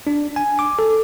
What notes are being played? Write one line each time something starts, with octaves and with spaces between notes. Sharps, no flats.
D4
G#5
D6
A4